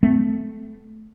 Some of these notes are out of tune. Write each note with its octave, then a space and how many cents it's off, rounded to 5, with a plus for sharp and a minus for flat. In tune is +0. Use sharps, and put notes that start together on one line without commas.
A3 -10 C4 -45